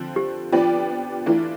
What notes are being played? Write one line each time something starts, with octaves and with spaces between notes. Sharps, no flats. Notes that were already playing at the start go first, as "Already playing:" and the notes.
Already playing: D3 F3 C4
G4
F3 B3 D4 F4 G4 D5
E3 A3 D4 E4 F4